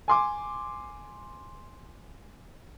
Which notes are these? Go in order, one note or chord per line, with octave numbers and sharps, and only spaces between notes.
G#5 C6 D6